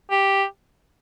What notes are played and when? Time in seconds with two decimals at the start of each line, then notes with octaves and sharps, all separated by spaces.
0.10 G4